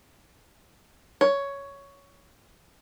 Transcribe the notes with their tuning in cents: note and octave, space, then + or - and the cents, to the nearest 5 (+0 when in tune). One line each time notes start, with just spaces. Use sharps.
C#5 +10